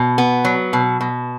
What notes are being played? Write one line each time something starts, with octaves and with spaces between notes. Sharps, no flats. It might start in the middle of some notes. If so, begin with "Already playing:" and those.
Already playing: B2
B3
F#3
B2
B2